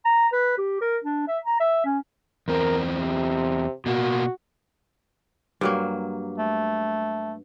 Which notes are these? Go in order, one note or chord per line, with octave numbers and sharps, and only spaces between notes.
A#5
B4
G4
A#4
D4
E5
A#5
E5
C#4
E2 C4 A#4
C3
B2 A#3 F#4
G2 F#3 A#3
A3